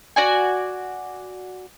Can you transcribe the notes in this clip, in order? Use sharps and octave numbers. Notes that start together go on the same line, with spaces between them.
F#4 D5 G#5